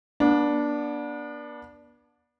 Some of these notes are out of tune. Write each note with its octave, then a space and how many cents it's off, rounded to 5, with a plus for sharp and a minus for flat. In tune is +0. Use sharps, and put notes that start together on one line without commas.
B3 -40 D4 +0